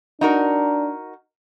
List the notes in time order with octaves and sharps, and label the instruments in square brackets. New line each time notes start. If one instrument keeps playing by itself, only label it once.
[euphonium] D4 [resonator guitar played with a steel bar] D#4 F#4 A#4